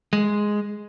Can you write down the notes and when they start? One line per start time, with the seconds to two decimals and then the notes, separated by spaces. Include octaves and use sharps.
0.13 G#3